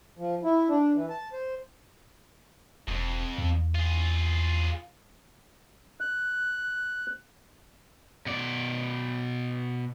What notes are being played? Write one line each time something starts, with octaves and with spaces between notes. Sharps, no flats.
F3
E4
D4
E3
A5
C5
E1 F2 G#2
E2
F4 G#4
F#6
B2 D5